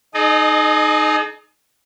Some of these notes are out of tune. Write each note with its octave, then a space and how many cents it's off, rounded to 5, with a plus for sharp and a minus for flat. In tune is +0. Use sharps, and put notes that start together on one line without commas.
D#4 -10 G#4 +35 D#5 -35